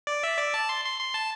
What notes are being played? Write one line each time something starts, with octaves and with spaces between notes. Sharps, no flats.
D5
E5
D5
A5
C6
C6
C6
A5